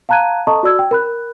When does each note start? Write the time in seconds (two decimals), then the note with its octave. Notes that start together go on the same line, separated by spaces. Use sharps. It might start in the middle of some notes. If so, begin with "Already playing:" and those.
0.09 F5 A5 A#5 F#6 G#6 D#7
0.47 A4 D#5 A5 A#5 C#6 D#6
0.63 F#4 D5 E6 G#6
0.79 G5
0.91 A#4 B5 F#6